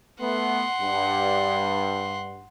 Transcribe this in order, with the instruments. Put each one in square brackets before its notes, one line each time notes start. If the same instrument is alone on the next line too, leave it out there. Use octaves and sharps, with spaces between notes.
[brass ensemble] A3 B3 [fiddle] F#5 C6
[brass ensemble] G2